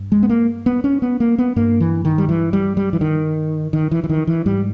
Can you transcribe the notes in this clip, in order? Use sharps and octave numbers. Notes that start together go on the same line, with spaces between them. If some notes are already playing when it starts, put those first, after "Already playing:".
Already playing: G2
G#3
B3
A#3
B3
C#4
B3
A#3
B3
G2 A#3
E3
D#3
G3
E3
G3
G3
E3
D#3
D#3
E3
E3
D#3
E3
G#2 G3